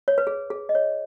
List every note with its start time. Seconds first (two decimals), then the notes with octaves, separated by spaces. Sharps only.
0.08 C#5
0.18 B4
0.27 G#4
0.50 G#4
0.69 D#5
0.75 C#5